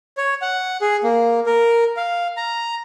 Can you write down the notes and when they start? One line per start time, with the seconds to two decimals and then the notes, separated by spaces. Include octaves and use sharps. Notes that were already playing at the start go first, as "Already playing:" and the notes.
0.17 C#5
0.42 F#5
0.81 G#4
1.04 A#3
1.46 A#4
1.97 F5
2.37 A#5